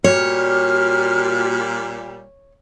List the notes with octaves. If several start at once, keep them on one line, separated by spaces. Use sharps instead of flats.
A#2 G3 F#4 C#5 F6